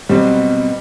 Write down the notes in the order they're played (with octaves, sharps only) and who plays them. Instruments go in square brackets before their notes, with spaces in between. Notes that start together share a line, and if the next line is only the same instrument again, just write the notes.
[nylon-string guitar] B2 F#3 C4 [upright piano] G3